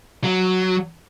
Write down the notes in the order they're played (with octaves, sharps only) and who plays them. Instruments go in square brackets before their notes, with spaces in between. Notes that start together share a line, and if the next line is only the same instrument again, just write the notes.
[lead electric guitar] F#3